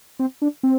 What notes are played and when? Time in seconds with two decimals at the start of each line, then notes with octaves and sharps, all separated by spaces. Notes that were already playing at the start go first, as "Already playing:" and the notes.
0.19 C4
0.42 D4
0.63 C4